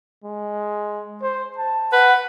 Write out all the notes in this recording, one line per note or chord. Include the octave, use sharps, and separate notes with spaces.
G#3
C5
A5
B4 F#5